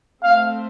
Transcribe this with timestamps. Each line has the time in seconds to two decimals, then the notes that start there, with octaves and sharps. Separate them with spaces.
0.24 A3 C4 F5